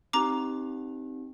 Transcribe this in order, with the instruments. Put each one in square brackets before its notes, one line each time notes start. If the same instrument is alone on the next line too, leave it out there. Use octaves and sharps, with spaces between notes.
[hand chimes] C4 D#4 G4 [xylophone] A#5 D6